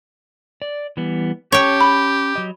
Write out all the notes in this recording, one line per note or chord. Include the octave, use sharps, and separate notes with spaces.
D5
E3 G3 B3
C#4 G4 C#5 G5 A5
B5
F#3 D#5